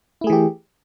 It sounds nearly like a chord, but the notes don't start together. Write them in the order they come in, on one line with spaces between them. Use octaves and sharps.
E4 A3 G#4 E3 G4